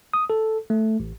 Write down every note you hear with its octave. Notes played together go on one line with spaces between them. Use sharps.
D#6
A4
A3
A1